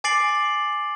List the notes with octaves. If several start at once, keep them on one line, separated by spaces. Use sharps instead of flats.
G#5 D6 A6 C7 D7 F#7